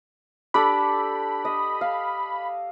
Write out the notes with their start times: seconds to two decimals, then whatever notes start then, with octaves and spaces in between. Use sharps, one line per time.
0.54 D4 G4 A4 B5
1.45 D#5
1.81 F5